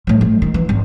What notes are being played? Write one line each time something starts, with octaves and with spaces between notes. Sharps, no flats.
A2 F3
F3
D#3
E3
G#1